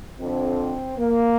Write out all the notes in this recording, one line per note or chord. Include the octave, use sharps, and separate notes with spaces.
F2 D3 C4
A#3